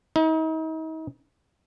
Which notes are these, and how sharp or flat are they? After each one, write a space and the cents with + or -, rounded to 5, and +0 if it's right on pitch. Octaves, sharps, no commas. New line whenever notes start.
D#4 +40